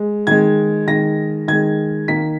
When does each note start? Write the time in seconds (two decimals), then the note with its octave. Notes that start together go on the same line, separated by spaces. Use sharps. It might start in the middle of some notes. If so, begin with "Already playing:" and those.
Already playing: G#3
0.27 D#3 G#3 G#6
0.87 D#3 G#3 A#6
1.48 D#3 G#3 G#6
2.08 D#3 A#3 B6